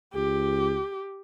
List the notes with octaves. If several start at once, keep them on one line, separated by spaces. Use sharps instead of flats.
C#2 G4